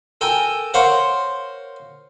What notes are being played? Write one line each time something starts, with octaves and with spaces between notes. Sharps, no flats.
A4 A#4 G5 G#5
A#4 C5 C#5 F5 F#5